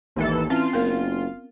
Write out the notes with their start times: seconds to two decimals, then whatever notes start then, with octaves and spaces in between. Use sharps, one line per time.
0.16 A1 D#2 E3 A4
0.50 E3 C4 C#4 F4
0.73 F#1 B3 A#4 F5